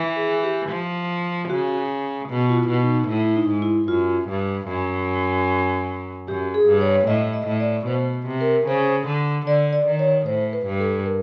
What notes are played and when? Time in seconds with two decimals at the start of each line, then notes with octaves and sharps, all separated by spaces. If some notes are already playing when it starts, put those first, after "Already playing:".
Already playing: E3
0.16 G#4
0.43 G4
0.70 F3
1.49 C#3 F#4
2.29 B2
2.49 F4
2.56 E4
2.69 B2
2.83 D#4
3.08 A2 E4
3.24 E4
3.36 D#4
3.49 G#2
3.62 E4
3.88 F#2 F4
4.29 G2
4.68 F#2
6.28 F#2 G4
6.54 G#4
6.67 G2
6.81 C#5
7.07 A2 D#5
7.33 D#5
7.47 A2
7.60 D5
7.87 B2 C5
8.27 C3
8.41 A#4
8.67 C#3 C5
9.07 D3
9.46 D3 D5
9.73 D5
9.87 D#3
9.99 C#5
10.26 A2 C5
10.53 B4
10.67 G2
10.80 A4
11.06 A#4